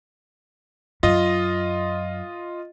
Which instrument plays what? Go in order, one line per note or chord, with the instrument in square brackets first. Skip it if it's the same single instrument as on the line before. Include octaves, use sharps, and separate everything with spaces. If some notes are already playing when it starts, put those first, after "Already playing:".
[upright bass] F#2 [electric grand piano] F4 D#5